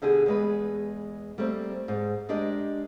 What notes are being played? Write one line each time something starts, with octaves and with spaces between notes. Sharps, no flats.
B2 D3 G4 G#4
E2 G#3 B4
G3 A3 A#3 C4
G#2
G#3 D4 G4 A#4 D#5